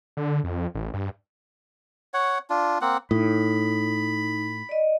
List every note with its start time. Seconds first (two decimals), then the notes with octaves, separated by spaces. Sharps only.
0.17 D3
0.44 F2
0.75 A1
0.94 G2
2.14 C#5 F#5
2.50 D4 F4
2.81 A#3 C4 F#5
3.11 A2 D#4 B5
4.69 D5 D#5